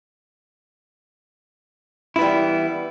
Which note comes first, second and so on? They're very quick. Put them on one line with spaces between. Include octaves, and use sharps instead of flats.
E4 B3 G3 E3